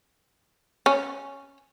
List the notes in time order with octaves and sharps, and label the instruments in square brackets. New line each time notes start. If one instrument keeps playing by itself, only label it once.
[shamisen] C#4